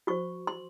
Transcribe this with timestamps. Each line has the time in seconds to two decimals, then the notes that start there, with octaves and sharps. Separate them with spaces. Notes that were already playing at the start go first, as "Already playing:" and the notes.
0.07 F#4 C5 C#6
0.47 C6